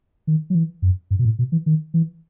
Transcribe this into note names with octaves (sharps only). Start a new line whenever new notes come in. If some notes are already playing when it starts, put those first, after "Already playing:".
D#3
F#3
E3
F#2
G2
B2
A2
B2
E3
D#3
E3